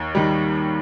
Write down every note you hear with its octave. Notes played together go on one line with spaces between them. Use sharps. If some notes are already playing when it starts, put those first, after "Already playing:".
Already playing: D#2 C#5
D#3 G3